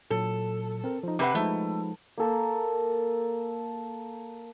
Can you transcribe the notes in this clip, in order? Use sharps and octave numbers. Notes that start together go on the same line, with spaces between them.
A#2 F#3 A4
C4 A#4
F3 D#4
C3 B4 F#5 D6 F#6 C7
F3 G#3 A3 D#4
A#3 A4 A#4